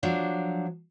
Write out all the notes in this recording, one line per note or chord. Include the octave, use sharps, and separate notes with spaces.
F3 F#3 D4